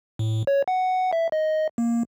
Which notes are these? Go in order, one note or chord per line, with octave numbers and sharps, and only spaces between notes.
A2
C#5
F#5
E5
D#5
A#3